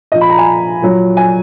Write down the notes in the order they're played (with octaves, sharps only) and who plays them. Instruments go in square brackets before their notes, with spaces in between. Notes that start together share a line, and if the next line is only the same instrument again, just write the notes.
[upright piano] A#2 F3 D#5
B5
A#5
G#5
A#2 F#3
G#5